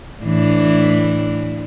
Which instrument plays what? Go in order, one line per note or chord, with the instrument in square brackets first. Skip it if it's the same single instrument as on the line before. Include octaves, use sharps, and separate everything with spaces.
[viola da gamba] A2 E3 D4